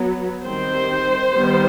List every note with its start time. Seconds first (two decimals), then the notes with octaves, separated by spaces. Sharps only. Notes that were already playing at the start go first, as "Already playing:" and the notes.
Already playing: F#3 B3
0.45 D#3 G3 C4 C5
1.32 D#3 G3 B3